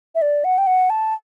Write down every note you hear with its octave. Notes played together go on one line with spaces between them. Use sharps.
E5
D5
F#5
G5
F#5
A5